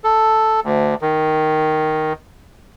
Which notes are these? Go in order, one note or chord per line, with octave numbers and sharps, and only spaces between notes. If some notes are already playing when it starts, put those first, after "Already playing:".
A4
D2
D#3